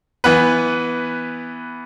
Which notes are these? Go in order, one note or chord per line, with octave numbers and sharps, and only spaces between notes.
E3 B3 B4